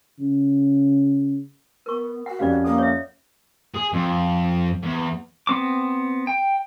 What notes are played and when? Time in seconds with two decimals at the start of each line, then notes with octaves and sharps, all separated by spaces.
0.19 C#3
1.86 B3 A#4 C#6
2.26 F#4 F#5
2.39 F2 C#4 G4 D5 F5
2.64 A#3 A4
2.78 C#5 E5
3.74 G#4
3.93 F2
4.83 E2
5.47 B3 C4 D6
6.27 G5